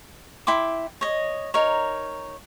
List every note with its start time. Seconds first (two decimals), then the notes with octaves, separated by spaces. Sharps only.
0.47 E4 G5 C6 D6
1.01 C#5 D#5
1.54 D#4 A#4 C#5